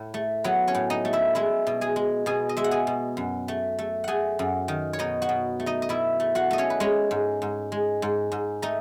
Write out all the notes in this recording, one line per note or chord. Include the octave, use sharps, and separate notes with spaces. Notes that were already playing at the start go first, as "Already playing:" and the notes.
Already playing: A2
A3
F#3 B3 B4
C#4 C#5
A2
D#4 D#5
A3
E4 E5
G#3 E4 E5
B2
G#4 G#5
G#3
B2 G#4 G#5
D#5
G#3 E5
F#5
G#4 G#5
B2
F#2
A3
A3
A3 G#4 F#5 G#5
F#2
D#3
C#5
B2 D#4 D#5
F#4 F#5
B2
A3
D#4 D#5
D#5
B2 E4 E5
A3
F#4 F#5
A3 D#5
C#4 C#5
B4
G#3 C#4 C#5
G#2
G#2
G#3
G#2
G#2
A3 D#4 D#5